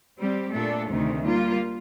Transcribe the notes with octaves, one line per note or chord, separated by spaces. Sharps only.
G3 C4 G4
A#2 A3 D4 A4
D2 C3 D#3 A3
G3 A#3 F4